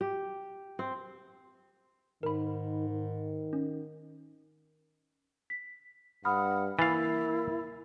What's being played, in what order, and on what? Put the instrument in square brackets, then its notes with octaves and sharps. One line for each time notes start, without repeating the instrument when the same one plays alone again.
[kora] G4
C4
[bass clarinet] G#2 [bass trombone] D#3 [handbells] A#4 B5
[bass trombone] D#3
[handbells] C#4
[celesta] B6
[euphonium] G2 [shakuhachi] F#5 [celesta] B5 D#6 F6
[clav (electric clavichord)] E3 F5 [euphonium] A#3 [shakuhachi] E4 [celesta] A6